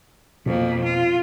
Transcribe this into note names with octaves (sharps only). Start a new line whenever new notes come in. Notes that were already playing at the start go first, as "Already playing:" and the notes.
F2 B2 A#3 C4
F4